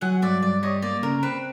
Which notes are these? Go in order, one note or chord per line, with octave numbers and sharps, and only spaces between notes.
F#3 F#5 G#5
G2 D5 E5
G2 D5
G3 C#5 D#5
A#3 D5
C#3 A#4
C4 B4